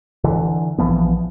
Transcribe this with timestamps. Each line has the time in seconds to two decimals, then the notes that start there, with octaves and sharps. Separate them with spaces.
0.24 D3 E3
0.78 A#1 E3 F3 B3